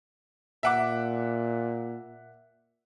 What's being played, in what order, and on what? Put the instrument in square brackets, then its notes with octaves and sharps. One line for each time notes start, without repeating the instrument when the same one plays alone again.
[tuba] A#2 [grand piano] E5 F#5 D6